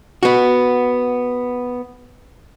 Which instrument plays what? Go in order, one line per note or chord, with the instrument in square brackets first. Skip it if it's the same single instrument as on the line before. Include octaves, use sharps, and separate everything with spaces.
[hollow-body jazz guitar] B3 F#4